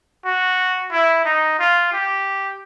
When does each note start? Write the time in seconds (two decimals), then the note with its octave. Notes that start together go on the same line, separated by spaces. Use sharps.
0.25 F#4
0.91 E4
1.25 D#4
1.59 F4
1.92 G4